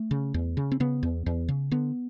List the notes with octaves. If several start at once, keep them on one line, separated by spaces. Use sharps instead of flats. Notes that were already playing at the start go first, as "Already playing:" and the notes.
Already playing: A3
C#3
E2
C#3
C4
C#3 B3
E2
E2
C#3
D3 B3